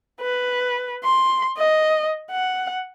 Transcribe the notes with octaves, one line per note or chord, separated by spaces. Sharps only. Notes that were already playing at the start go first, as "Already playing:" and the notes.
B4
C6
D#5
F#5